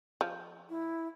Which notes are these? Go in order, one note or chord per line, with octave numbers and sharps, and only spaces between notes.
F3
E4